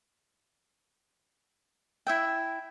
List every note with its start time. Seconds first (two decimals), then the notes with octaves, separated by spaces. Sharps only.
2.07 E4 E5 G5